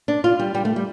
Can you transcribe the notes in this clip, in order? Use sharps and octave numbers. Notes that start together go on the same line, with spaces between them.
D4
F4
G3
G3
A3
G3